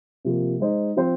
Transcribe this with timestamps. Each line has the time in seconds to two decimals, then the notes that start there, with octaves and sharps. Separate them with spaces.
0.25 C3 F3 A#3
0.60 G#3 D#4 C5 D#5
0.96 F3 C4 F4 C5